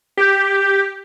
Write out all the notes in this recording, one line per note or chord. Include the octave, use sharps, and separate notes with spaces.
G4